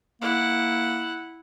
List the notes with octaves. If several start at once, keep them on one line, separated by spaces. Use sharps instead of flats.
A#3 E4 F#5